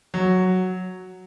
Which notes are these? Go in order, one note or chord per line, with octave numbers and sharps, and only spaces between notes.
F#3